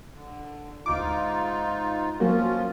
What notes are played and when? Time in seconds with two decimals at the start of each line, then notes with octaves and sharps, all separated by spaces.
0.13 D3
0.86 D2 G#2 D#4 F4 D6
2.20 F3 F#3 A#3 C#4 F4 F#4